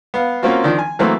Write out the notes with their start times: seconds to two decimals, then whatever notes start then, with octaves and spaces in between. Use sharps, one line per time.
0.14 B3 F5
0.43 A#3 C4 C#4 F4 F#4
0.64 D#3 F3 D4
0.79 G#5
0.99 E3 F#3 A3 A#3 C4